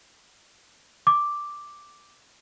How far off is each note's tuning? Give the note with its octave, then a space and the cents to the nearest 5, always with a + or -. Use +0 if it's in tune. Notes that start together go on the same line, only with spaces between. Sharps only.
D6 +0